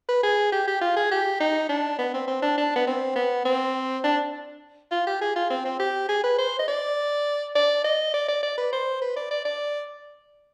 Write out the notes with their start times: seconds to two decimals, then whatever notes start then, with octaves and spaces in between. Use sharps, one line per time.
0.09 B4
0.23 G#4
0.52 G4
0.67 G4
0.81 F4
0.96 G#4
1.11 G4
1.40 D#4
1.69 D4
1.99 B3
2.14 C4
2.27 C4
2.42 D4
2.58 D4
2.76 B3
2.87 C4
3.16 B3
3.45 C4
4.04 D4
4.91 F4
5.06 G4
5.21 G#4
5.36 F4
5.50 C4
5.65 C4
5.79 G4
6.09 G#4
6.24 B4
6.38 C5
6.59 D#5
6.68 D5
7.55 D5
7.84 D#5
8.14 D5
8.28 D5
8.43 D5
8.58 B4
8.72 C5
9.01 B4
9.16 D5
9.31 D5
9.45 D5